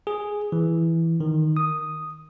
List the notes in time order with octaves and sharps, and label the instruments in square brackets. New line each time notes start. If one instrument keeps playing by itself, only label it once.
[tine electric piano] G#4
E3
D#3
D#6